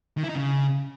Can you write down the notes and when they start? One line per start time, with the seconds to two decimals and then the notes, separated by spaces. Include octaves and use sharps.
0.17 D#3
0.23 E4
0.29 D#4
0.35 C#3